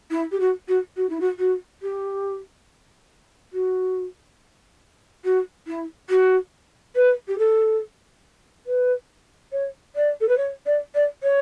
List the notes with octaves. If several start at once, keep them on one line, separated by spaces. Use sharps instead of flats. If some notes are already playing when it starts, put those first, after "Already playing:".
E4
G4
F#4
F#4
F#4
E4
F#4
F#4
G4
F#4
F#4
E4
F#4
B4
G4
A4
B4
C#5
D5
A4
B4
C#5
D5
D5
C#5